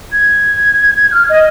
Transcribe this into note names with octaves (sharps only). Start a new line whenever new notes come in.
G#6
F6
D#5